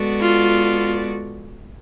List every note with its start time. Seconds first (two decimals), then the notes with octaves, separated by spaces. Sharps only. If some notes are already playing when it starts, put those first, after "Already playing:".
Already playing: G#3 B3 F#4 A4 D5
0.21 F4